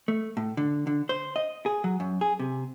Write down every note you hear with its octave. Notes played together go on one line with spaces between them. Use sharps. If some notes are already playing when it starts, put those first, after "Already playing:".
A3
A2
D3
D3
C5
D#5
G#4
F#3
F#2
G#4
C3